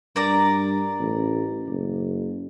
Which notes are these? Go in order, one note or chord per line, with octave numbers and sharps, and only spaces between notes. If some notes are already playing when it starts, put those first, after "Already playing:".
G2 A#4 D5 A#5
A1
F#1